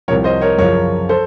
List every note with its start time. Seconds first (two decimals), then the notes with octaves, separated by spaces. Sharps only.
0.08 C2 C3 F3 A#4 C#5
0.24 C5 D#5
0.41 A#4 C#5
0.58 F#2 C#3 F3 A#4 C#5
1.09 A4 C5